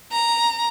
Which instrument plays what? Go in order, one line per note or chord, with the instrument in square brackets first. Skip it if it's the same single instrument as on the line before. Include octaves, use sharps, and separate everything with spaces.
[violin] A#5